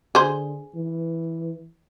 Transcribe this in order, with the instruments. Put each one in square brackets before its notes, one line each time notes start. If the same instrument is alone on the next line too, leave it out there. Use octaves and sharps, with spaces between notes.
[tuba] D3 [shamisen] G#4 C5
[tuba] E3